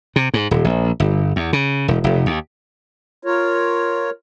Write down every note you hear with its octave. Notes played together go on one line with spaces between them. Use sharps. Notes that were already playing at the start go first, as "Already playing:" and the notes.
C3
G#2
D#1
A#1
G1
E2
C#3
E1
F1
D#2
F4 A#4 C#5